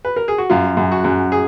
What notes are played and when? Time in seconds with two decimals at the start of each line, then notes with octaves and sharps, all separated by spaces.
0.05 B4
0.16 A#4
0.28 G#4
0.38 F#4
0.50 F#2 F4
0.77 F#2
0.92 F#4
1.04 F#2
1.32 G#4